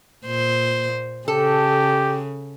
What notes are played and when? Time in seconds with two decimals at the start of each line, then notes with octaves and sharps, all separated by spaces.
0.25 A#2 C5
1.28 C#3 G4 A4